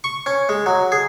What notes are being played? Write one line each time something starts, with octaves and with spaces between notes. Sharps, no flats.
C#6
C#4
G#3
F#3
G#4